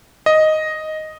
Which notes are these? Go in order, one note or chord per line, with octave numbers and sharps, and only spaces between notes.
D#5